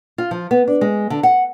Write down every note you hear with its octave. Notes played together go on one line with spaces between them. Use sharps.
F4
F3
B3
D4
G#3
D3
F#5